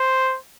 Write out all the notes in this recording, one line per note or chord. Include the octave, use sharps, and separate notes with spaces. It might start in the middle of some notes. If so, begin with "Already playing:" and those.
Already playing: C5